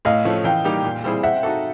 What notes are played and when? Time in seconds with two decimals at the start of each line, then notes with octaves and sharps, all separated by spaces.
0.05 A2 D#5 F5
0.25 F3 A3 C#4
0.44 E3 F5 G5
0.64 G3 A#3 D#4 G4
0.84 A#2
1.04 G3 C4 E4 G#4
1.23 C4 E5 F#5
1.43 D#4 F#4 A4